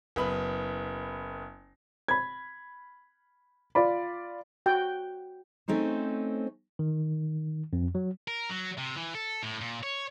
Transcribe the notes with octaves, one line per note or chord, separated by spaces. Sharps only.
F#1 B3 B5
B5 G#6
F4 D5 B5
F#4 G5
A3 C4 C#4 D#4 C5
D#3
F2
F#3
A#4
F#3
C3
E3
A4
A2
A#2
C#5